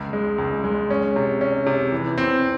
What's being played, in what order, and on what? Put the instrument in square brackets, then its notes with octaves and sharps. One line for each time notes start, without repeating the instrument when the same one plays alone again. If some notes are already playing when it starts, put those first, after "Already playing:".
Already playing: [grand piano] C#2
G#3
C#2
G#3
C#4
C3
C#4
C3
E3
C4